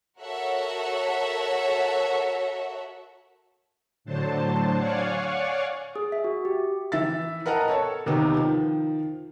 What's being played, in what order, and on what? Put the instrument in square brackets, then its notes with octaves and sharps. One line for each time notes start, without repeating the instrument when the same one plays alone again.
[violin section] F#4 A4 A#4 C#5 E5 F#5
[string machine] A2 D3 F#3 C5 A5
C#5 D5 F5 F#5 G#5 C#6
[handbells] G#4
E5
F#4
G4
[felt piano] E3 E5 A6
A#4 B4 D#5 F#5 A5 A#5
A4 C#5 A5
D#2 C3 B3 D#4
D#3 F3